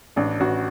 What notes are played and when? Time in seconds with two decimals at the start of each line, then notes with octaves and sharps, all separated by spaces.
0.16 A1 D4
0.40 A1 F#4